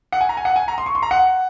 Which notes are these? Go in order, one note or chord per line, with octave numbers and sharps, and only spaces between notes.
F#5
G#5
A#5
G#5
F#5
G#5
A#5
C6
C#6
C6
A#5
F#5